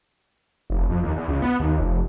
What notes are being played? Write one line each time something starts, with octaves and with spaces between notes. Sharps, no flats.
F1
F2
D#2
E2
C#2
B3
D#2
F1